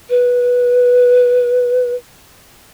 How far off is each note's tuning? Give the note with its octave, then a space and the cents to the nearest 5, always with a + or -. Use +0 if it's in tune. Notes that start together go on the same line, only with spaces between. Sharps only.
B4 -10